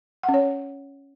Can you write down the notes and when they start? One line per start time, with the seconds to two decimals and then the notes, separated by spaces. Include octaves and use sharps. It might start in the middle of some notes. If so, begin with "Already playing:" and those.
0.23 F#5
0.29 C#4
0.34 C#5